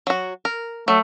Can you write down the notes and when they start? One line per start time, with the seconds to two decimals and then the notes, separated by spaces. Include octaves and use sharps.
0.07 F#3 F#4
0.45 A#4
0.88 F#3 A3